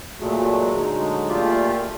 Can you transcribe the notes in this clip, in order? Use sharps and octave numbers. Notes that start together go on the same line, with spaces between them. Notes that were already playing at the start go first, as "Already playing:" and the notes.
A#2 F#3 G#3 A3
D3 F#3 G#3 D#4
A#2 A3 F4 G4 D5